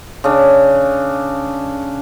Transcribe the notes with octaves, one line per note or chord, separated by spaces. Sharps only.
C#3 D4